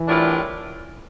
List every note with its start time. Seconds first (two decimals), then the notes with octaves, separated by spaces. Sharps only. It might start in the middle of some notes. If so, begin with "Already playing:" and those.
Already playing: E3
0.08 A2 G3 D4 F4 A#4